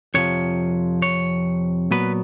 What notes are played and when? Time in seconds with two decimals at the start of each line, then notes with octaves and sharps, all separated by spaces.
0.14 F2 C3 F3 C#5
1.02 C#5
1.91 A#2 F#3 B3 B4